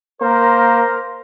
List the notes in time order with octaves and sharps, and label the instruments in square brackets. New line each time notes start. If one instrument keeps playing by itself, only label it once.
[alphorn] A#3 [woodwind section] A#4 [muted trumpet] C5